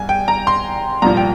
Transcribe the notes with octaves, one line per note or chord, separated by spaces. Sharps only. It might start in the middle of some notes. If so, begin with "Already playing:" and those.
Already playing: C2 G#5
G5
A#5
C6
C2 A#2 F3 A#5
G5